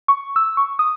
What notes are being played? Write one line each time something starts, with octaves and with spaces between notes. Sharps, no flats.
C#6
E6
C#6
D#6